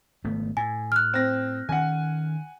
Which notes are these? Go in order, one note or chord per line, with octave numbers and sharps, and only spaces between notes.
G#1 A3 B3
A2 G#5
F6 F#6
C4 A#6
D#3 C#4 F#5 G#5